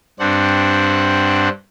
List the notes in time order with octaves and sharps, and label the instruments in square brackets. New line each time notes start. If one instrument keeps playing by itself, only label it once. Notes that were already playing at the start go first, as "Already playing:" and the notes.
[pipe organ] G2 C4 D4 F#5